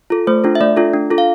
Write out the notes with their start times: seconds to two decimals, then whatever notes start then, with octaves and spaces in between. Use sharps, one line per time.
0.10 F4 A4
0.27 A3 C5
0.44 D4 F4 A4
0.55 E5
0.60 A3 D5
0.76 D4 F4 A4
0.93 D4
1.10 F4 A4
1.18 F5